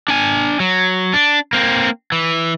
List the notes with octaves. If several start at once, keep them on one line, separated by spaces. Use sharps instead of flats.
D4 G#5
F#3
D4
A#3 C4
E3